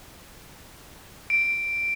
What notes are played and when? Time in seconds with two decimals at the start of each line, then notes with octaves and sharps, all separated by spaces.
1.30 D7